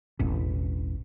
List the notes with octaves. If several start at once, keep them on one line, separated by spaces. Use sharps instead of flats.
E1 A1